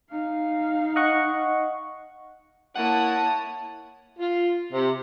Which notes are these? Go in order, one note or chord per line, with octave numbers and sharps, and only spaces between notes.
D#4 F5
D#5 F#5 C#6
A#3 E4 C#5 F#5 A5 D#6
F4
C3